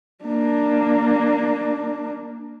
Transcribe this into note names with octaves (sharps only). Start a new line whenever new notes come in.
A#3 D4